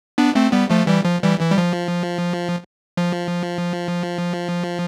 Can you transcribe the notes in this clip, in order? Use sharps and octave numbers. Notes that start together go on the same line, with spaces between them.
B3 D4
A3 C4
G3 B3
F3 A3
E3 G3
F3
E3 G3
E3
G3
F3
F3